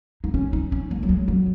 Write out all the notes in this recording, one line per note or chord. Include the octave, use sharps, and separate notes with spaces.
D#4
C#4
D#4
C#4
A#3
F#3
G#3
F#3